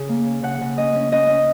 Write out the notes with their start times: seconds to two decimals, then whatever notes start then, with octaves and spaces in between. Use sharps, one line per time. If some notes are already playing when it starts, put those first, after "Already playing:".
Already playing: C#3 G#4
0.09 A#3
0.27 C#4
0.43 C#3 F#5
0.61 C#3
0.78 C#4 D#5
0.95 C#4
1.12 C#4 D#5
1.29 C#4